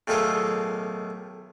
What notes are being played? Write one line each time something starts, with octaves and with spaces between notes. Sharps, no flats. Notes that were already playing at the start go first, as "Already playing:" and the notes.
B1 A2 D#3 F4 G#4 A4